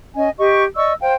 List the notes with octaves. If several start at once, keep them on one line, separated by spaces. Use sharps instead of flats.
C#4 D#5 G#5
G4 D#5 C#6
D5 D#5 C#6 E6
C5 F5 G5